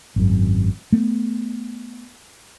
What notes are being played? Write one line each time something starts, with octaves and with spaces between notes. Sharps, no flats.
G#1 F#2
A3 B3